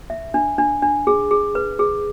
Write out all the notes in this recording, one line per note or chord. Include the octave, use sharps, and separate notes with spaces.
E5
D4
D4
D4
G#4
G#4
B4
G#4